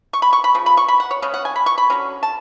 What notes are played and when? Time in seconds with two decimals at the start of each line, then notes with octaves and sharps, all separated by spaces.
0.13 C#6
0.22 B5
0.33 C#6
0.44 B5
0.55 C#3 F3
0.66 B5
0.77 C#6
0.88 B5
1.00 F#5
1.11 C#5
1.22 C#3 G#3 C#4
1.34 F#5
1.45 G#5
1.56 B5
1.66 C#6
1.78 B5
1.90 D3 F#3 C#4
2.23 A5